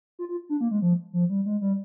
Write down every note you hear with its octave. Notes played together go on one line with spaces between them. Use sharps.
F4
F4
D4
A#3
G#3
F3
F3
G3
G#3
G3